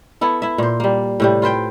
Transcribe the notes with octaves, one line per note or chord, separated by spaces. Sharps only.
B3 E4 A4
E4 E5
A#2 C5
G3 A#3
A2 C3 G3
F4 B4 C5 G5